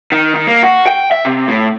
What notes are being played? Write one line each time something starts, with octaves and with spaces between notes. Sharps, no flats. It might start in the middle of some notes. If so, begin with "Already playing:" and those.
D#3
D#3
A#3
F#4
G5
E5
C3
A2